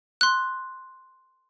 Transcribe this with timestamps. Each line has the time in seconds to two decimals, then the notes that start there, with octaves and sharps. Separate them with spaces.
0.21 C6 F#6